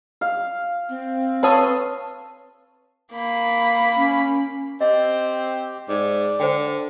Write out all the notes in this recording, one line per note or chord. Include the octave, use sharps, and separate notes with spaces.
F5
C4
A4 B4 C#5 F5 C6 D#6
A#3 B5
C#4
C4 G4 D#5
G#2 D5
D3 C5 G5